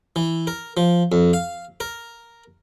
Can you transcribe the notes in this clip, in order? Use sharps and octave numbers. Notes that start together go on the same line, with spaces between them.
E3
A#4
F3
F2
F5
A#4